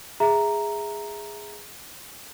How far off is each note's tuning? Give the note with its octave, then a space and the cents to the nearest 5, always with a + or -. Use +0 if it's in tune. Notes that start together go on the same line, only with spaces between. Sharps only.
G#4 -5 E5 +0 A#5 +0